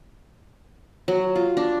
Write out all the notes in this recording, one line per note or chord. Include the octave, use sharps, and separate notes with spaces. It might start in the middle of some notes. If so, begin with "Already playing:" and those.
F#3
F4
D4